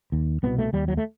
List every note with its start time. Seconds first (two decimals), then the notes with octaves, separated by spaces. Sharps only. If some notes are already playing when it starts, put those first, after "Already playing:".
0.12 D#2
0.43 C2 B2 B3
0.59 A3
0.73 D#2 G3
0.88 F#3
0.97 A3